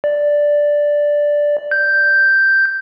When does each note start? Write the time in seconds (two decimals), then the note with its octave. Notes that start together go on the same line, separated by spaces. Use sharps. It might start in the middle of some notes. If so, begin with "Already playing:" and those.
0.04 D5
1.71 G6